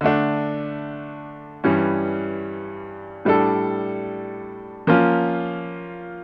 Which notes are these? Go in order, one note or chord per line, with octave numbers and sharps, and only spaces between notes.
D3 A3 D4
G2 E3 G3 C#4
A2 G3 D4 A4
F3 A#3 C#4 F4